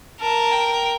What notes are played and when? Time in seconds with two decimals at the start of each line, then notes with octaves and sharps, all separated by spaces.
0.21 A#4 A5
0.53 G5